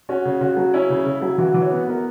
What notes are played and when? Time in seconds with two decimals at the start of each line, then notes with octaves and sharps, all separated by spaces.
0.09 C#4 F#4
0.25 C#3
0.41 C#3 F#4
0.57 F#3
0.74 C#4 E4
0.90 C#3
1.05 C#3
1.22 F#3
1.38 E3 F#4
1.54 E3
1.61 C#5
1.70 B3 B4
1.87 B3 A#4